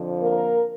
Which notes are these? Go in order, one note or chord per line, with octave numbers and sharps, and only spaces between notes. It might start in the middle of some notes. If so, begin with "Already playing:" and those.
Already playing: F2 D3 F3
A#3 A#4